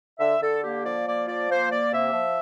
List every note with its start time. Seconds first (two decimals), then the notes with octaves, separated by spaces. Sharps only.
0.19 D3 E5
0.41 D3 A4
0.62 A#3 G4
0.84 F3 D5
1.06 A#3 D5
1.27 F3 D5
1.49 A#3 C5
1.70 A#3 D5
1.92 C3 E5
2.13 F3